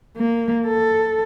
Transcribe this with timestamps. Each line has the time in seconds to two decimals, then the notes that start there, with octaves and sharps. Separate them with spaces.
0.17 A#3
0.67 A4